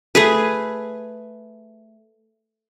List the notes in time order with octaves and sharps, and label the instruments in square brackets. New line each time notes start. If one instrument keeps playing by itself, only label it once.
[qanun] A3 G#4 B4